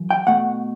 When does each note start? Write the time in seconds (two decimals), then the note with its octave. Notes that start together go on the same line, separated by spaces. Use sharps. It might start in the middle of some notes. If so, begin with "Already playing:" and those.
Already playing: F#2 E3
0.10 G5
0.27 B2 A3 F#5